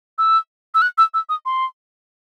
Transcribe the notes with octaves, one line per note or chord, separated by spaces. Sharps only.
E6
E6
F#6
E6
E6
D#6
C6